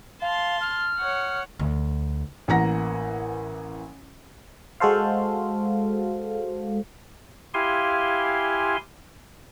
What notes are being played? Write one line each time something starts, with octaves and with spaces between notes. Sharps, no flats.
F5 A5 C6
F6
C#5 F#5
D2
A1 E3 A#3 F#5 A#5 A#6
G#3 F#4 A4 C5 F5
E4 G4 F5 G#5 C6